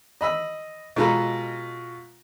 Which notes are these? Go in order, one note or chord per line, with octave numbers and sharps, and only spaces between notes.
D#5 B5 E6
B2 G#3 F4 A4 A#5 B5